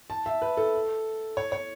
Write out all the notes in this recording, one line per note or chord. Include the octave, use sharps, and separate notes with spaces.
A5
E5
B4
A4
C#5
C#5